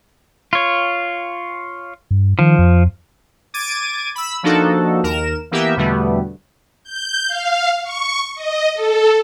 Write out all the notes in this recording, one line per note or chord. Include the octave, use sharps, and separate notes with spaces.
F4 C#5
G2
D#3 F3
F2
D6 G#6 A6 D7 D#7
B5 E6
F3 A#3 D4 D#4 F#4 A4
D#2 A#4 E7
E3 A#3 B3 G4 E5
E2 B2 D3 G3 A3 B3
G6
F5
C#6
D#5
A4